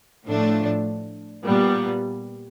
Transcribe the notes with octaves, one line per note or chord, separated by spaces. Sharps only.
A2 F3 A3 D4
A#2 G3 B3